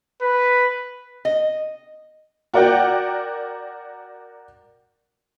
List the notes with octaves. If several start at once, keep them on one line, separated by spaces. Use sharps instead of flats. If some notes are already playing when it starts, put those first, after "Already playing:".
B4
D#5
F#4 A#4 D5 F#5 G5